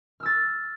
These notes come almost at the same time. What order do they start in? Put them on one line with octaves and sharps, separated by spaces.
F6 E6 A6